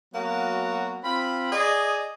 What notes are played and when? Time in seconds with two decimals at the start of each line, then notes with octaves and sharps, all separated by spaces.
0.14 F#3 A#3 B3 F#4
1.04 C4 F4 B5
1.53 G#4 D5 D#5